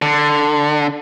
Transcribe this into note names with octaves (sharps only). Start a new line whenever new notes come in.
D3